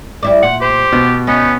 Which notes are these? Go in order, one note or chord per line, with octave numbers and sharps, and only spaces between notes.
G3 E4 D5
A#2 F#5
G4 C5
B2 B3
B3 C#4 D#4